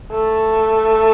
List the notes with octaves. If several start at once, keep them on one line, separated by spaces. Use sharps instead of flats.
A3